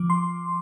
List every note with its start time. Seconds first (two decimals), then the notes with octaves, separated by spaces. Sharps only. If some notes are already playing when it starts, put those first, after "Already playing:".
Already playing: F3 D6
0.10 C6